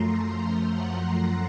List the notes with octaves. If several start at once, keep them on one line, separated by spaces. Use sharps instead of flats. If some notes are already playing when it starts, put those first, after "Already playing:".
Already playing: F#2 F3 A3 A#5 C6
F#5